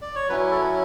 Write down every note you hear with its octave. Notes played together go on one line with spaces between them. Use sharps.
D5
C#5
F#3 C#4 E4 B4
A4